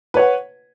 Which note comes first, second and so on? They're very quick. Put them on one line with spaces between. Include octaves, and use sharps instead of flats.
B4 C#5 F#5